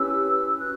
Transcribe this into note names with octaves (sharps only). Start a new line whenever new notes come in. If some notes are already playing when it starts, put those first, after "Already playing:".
Already playing: C#4 E4 G4 B4 E6
F#4 F#6